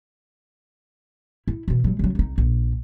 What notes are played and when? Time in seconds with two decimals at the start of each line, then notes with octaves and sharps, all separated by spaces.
1.48 E4
1.68 B2 E3
1.84 F#3 G#3
1.99 C#3 F#3
2.15 C2 D#4
2.38 A#1